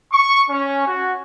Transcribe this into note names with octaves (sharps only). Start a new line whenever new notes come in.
C#6
C#4
F#4